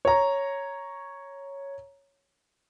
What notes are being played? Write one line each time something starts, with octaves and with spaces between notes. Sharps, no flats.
C#5 A#5